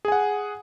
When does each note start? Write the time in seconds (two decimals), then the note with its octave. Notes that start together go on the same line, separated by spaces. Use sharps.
0.05 G#4
0.08 G#5
0.12 F#5